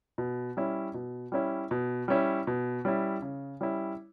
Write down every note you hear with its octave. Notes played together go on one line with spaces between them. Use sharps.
B2
G3 C#4 E4
B2
G3 C#4 E4
B2
G3 C#4 E4
B2
G3 C#4 E4
C#3
G3 C#4 E4